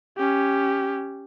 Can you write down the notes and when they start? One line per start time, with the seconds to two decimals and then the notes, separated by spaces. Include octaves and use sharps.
0.18 C#4 G4